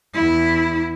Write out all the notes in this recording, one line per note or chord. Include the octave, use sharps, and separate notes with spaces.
E2 E4